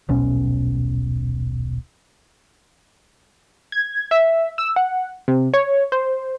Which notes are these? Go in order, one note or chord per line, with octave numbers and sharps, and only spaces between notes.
D#1 B1 B2 C#4
G#6
E5
E6
F#5
C3
C#5
C5